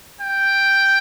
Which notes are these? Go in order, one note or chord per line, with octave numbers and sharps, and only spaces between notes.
G5